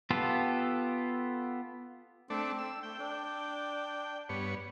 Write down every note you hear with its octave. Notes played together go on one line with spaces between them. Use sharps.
B3 F4 G4 A4
A3 C4 D4
E6
A3 G5
D4
G2 B3 C#5